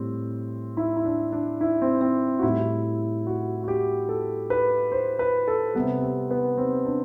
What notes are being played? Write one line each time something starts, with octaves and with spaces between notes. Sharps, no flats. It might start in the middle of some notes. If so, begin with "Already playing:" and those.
Already playing: A2 G3 C4
E4
E4
D4
D4
E4
C4
C4
F#4
A2 G3 E4
F#4
F#4
G4
A4
B4
C5
B4
A4
C3 G3 B3
C4
B3
C4
D4